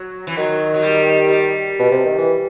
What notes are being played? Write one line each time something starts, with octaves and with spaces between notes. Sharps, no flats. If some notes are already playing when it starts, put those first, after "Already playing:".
Already playing: F#3
E3
D#3 F#3
F#3
G3
G3
B2
C3
D#3
E3